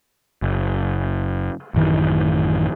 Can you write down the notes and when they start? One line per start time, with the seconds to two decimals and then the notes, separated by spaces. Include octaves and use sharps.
0.42 F#1
1.74 A1 F#2 D#3 E3